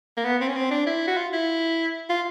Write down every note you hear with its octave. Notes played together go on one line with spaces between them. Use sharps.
A#3
B3
C4
C#4
C4
D4
E4
F#4
F4
E4
F4